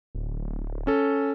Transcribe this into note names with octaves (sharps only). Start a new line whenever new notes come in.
D1
C#4 A4